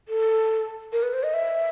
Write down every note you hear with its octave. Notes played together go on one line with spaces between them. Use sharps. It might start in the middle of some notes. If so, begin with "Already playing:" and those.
A4
A#4
B4
C5
D#5
E5